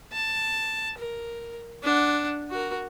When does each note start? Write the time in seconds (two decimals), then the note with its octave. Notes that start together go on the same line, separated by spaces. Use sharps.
0.13 A5
0.98 A#4
1.83 D4 F#5
2.50 F#4 A#4